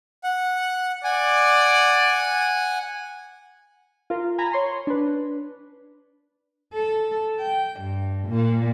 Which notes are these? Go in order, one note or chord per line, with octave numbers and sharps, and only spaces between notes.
F#5
D5 F#5 G#5
F4 A#4
G#5 A#5 B5
C#5 C6
D4 B4
A4
G5
G2
A#2